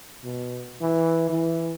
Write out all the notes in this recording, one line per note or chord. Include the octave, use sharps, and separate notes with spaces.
B2
E3
E3